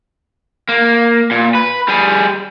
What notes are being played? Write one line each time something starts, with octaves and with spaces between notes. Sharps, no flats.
A#3
A#2
B4
G3 G#4